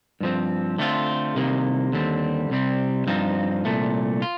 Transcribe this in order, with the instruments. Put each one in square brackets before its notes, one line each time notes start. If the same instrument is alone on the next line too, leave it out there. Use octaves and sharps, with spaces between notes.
[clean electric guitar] G2 F3 C4
D3 A3 C4 F4
C2 C3 D#3 A#3
D#2 D3 G3 C4
C2 C3 G3 C4
G2 F3 C4 D#4
C2 A#2 A3
F4